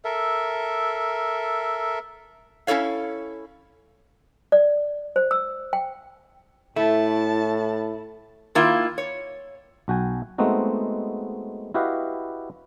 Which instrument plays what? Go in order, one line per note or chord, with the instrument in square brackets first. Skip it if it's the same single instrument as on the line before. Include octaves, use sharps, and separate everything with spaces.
[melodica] A4 A#4 E5
[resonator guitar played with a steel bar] C#4 E4 A4 C#5 F5
[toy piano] D5
C5
E6
G5
[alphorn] A2 [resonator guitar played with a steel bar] A3 [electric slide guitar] E4 [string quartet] A5
[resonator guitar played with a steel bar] D#3 A#3 E4 F4
C#5
[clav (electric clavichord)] B1 F#4 G5 G#5
G#3 A3 B3 C4 D#4 F#4
E4 F#4 G4 B4 D#5 F5